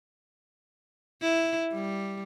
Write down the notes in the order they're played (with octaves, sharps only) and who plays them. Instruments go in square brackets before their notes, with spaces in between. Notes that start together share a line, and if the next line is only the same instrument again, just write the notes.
[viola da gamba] E4
G3